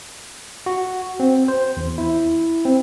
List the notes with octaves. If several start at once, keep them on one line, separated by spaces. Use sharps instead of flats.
F#4
C4
C5
E2
E4
C4